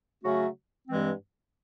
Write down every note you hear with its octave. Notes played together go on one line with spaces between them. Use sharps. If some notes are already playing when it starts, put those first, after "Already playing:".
C#3 F#3 A3 C#4 F#4
G2 E3 G#3 C4